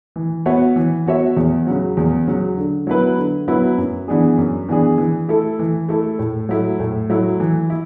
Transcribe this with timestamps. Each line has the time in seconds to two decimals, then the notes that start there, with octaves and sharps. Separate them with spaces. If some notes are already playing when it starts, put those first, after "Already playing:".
0.16 E3
0.46 B3 F#4 C#5 E5
0.76 E3
1.06 B3 F#4 C#5 E5
1.37 E2
1.67 C#3 F#3
1.97 E2
2.27 C#3 F#3
2.57 D3
2.87 F#3 B3 E4 B4
3.17 D3
3.48 F#3 B3 E4 B4
3.78 F#2
4.08 E3 B3 D4 G#4
4.38 F#2
4.69 E3 B3 D4 G#4
4.98 E3
5.28 A3 E4 A4
5.59 E3
5.89 A3 E4 A4
6.19 A2
6.49 F#3 A3 E4
6.80 A2
7.10 F#3 A3 E4
7.40 E3
7.70 E4